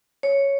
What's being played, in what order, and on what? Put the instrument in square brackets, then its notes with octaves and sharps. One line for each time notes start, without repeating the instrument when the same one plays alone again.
[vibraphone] C#5